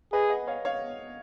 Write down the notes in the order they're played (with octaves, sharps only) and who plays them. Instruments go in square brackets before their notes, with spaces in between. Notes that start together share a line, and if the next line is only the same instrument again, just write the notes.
[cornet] G#4 [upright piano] B4 D#5
[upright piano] D#5 F#5
C#5 F5
C#5 F5